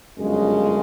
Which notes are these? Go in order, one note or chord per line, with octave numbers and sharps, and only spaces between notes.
G1 F#2 C#3 F3 G#3